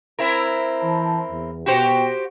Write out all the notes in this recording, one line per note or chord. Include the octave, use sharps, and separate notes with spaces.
C4 E4 A#4
E3 C5 A5
E2
B2 F#4 G4 C5 G5